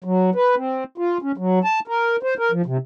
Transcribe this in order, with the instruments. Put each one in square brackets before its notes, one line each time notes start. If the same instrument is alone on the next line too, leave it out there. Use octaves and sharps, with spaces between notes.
[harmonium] F#3
B4
C4
F4
C#4
F#3
A5
A#4
C5
A#4
F3
C3